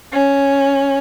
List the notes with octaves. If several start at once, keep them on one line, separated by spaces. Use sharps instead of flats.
C#4